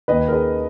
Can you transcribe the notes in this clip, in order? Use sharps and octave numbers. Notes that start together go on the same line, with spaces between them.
D#2 D#3 B4 D#5
A#4
G#4 B4